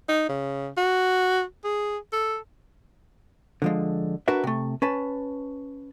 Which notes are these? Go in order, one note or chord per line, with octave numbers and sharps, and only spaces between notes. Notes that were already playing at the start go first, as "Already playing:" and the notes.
D#4
C#3
F#4
G#4
A4
D3 F3 G#3
D4 F#4 A#4 B4 E5
C3 A3
C#4 B4 A5